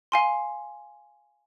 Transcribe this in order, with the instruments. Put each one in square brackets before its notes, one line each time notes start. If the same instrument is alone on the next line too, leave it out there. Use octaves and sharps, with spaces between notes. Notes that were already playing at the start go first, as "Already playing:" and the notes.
[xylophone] F5 G#5 C6